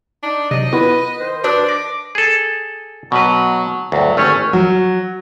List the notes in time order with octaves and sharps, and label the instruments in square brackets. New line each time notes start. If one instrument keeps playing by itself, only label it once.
[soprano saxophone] D4 [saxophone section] D#4
[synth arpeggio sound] C3 F#3 [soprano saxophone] D#5
[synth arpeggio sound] B3 E4 F4 [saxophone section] B4
[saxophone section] D#3 C5
[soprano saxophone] D4 [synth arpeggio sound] F#4 B4 D#6
[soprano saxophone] D6 [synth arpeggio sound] A#6
[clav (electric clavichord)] G#4 A4
[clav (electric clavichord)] B2 B4 [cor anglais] F#3
[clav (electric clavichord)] D2 G2 [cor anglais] F#3
[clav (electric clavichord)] G#1 A3 C#5 [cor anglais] C#4
[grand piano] F#3